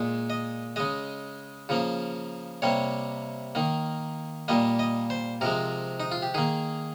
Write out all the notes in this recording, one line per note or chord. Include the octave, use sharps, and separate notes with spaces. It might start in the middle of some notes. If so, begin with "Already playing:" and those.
Already playing: A#2 G#3
D#5
C#3 G#3 D#5
C#3 F3 A#3
C3 G3 A#3 C#5
D#3 A#3
A#2 G3 A#3 D#5
D#5
C5
C3 F3 G#3 A#4
D#4
F4
G4
D#3 A#3 G#4